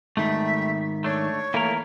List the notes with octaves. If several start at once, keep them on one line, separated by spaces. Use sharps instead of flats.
G#2 D#3 G3 A3 E5
A3 D4 C#5
E3 A3 A#3 A#4